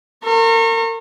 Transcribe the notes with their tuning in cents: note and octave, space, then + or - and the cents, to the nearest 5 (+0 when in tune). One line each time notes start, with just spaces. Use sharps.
A#4 -35 C#6 -35